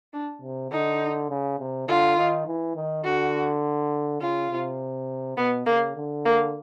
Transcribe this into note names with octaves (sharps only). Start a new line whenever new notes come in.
D4
C3
D3 D#4
C#3
C3
D3 F4
D#3
E3
D#3
D3 F#4
C#3 F4
C3
B2 B3
C#3 A#3
D3
A#3